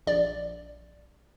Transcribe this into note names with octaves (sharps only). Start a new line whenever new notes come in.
A#1 D5